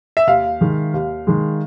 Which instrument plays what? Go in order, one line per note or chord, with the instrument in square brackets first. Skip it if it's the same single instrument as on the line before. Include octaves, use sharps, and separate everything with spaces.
[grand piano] E5
[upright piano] D#2 [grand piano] F5
[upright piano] D#3 G#3
D#2
D#3 G#3